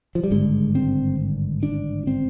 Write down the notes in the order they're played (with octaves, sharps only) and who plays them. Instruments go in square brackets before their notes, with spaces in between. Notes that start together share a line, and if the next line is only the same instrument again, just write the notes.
[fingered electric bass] F3
G3
G#1 G2 D3 G#3
C4
D4
C4